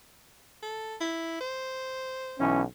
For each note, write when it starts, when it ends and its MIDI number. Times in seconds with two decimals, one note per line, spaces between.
0.62 0.96 69
1.00 1.37 64
1.41 2.47 72
2.39 2.62 35
2.39 2.62 52
2.39 2.62 61